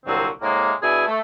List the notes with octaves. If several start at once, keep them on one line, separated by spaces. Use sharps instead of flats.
C2 A#2 D3 F#3 C4
A2 C3 G#3 A#3
B2 D4 E4 G#4 G#5
A3